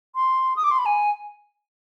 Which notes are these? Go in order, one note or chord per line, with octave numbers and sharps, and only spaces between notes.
C6
D#6
D6
C6
B5
G#5